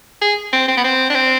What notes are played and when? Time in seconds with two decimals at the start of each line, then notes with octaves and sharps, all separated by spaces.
0.21 G#4
0.53 C4
0.68 C4
0.77 B3
0.84 C4
1.10 D4
1.15 C4